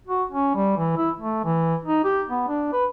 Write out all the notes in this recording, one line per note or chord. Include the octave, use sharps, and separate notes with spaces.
F#4
C#4
G3
E3
E4
A3
E3
D#4
G4
B3
D4
B4